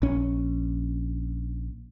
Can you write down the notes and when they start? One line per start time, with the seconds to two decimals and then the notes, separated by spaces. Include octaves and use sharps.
0.02 A#1 C#4